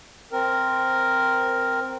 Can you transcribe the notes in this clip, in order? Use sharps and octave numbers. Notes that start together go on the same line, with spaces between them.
C4 A#4